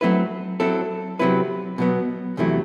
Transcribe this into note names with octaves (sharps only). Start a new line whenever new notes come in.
F#3 A3 C4 E4 B4
F#3 C4 E4 A4
C3 F#3 C4 E4 B4
B2 F#3 B3
E2 C3 F#3 A3 E4